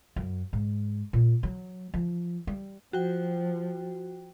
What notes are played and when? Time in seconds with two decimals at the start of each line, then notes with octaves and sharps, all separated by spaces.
0.16 F#2
0.53 G#2
1.13 A#2
1.43 F#3
1.94 F3
2.47 G3
2.93 F3 F#4 G5